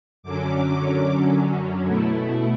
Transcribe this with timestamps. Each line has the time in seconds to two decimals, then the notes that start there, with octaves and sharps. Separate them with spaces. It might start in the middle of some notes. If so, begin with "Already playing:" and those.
0.23 F#2 D3 F#3 C#4 D6
1.87 B2 A3 E4